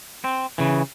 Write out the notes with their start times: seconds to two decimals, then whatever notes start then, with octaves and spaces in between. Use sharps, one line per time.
0.24 C4
0.58 C#3 E3